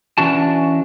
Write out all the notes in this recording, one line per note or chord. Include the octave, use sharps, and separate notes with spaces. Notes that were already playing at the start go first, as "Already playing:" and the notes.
E3 C#4 D4 F#4 A5